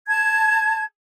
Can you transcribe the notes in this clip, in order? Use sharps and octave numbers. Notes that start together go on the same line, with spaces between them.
A5 G#6